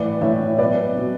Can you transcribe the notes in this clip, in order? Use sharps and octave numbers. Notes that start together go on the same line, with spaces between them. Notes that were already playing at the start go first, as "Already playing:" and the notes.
Already playing: A2 E3 B4 D5
A2 E3 C#5 E5
B2 F#3 B4 D5
B2 F#3